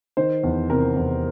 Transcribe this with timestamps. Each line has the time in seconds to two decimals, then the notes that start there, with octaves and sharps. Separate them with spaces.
0.17 D#3 C5
0.43 E2
0.70 C3 A#4
0.97 E2